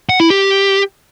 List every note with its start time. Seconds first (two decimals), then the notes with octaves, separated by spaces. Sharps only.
0.09 F#5
0.20 E4
0.30 G4